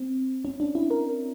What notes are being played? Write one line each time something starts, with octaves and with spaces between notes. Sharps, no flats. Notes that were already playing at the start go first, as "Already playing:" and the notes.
Already playing: C4
C#4
D4
E4
A#4